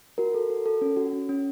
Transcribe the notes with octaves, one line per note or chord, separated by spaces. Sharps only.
F#4 A#4
A4
F#4
A4
C#4
F#4
C#4
C#4